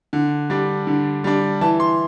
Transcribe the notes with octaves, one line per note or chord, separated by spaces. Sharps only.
D3
G3 D4
D3
G3 D4
E3 A5
C6